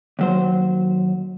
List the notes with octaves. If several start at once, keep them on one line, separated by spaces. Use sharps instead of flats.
D#2 F#3 C5